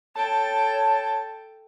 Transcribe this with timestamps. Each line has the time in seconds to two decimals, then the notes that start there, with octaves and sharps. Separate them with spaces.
0.16 A4 C#5 G5 A5